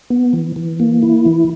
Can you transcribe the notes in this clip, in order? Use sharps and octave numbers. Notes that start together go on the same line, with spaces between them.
B3
E3
E3
A#3
E4
E3